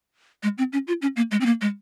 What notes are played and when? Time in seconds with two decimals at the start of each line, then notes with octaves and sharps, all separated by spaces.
0.43 G#3
0.58 C4
0.73 C#4
0.88 F4
1.02 C#4
1.16 A#3
1.31 G#3
1.41 C4
1.46 A#3
1.61 G#3